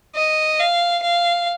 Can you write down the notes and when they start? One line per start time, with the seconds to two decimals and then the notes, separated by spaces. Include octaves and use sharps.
0.15 D#5
0.60 F5
1.02 F5